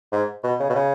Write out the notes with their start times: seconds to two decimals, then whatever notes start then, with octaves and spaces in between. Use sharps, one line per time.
0.12 G#2
0.43 B2
0.60 C#3
0.69 B2
0.75 C#3